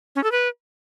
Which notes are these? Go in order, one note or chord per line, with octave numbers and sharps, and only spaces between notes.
C#4
A4
B4